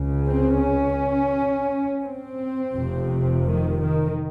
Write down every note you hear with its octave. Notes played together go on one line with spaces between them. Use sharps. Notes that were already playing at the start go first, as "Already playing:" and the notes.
Already playing: C#2 C#3
C4
C#4
C4
F1 F2 C3
D#3
D#3